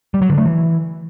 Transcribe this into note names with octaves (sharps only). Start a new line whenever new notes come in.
G3
F#3
D3
A3
E3